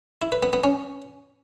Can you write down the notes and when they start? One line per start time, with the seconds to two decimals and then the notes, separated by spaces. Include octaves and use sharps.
0.22 E4
0.32 B4
0.43 B3
0.53 B3
0.64 C#4